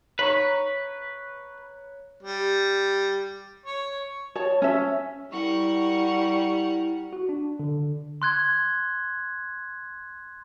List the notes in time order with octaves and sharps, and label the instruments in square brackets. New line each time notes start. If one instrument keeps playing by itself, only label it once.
[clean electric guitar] B4 [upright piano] C#5 A#5 C#6
[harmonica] G3
C#5
[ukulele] C#5 A5
C#4 E5
[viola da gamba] G3 [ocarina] E4 [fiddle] A#4 F#5 [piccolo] C#6
[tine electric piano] F#4
D4
D3
[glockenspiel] C6 F#6 G#6